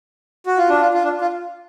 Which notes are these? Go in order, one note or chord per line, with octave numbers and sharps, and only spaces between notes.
F#4
F4
D4
F4
F4
D4
F4